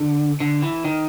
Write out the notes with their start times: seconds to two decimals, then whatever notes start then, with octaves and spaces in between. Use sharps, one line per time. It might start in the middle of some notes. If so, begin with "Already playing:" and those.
Already playing: D3
0.40 D3
0.62 E3
0.84 D#3